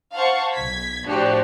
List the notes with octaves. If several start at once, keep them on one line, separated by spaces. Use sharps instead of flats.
C5 F5 F#5 A5 C#6
B1 G#6 B6
A2 F3 D4 F#4 G4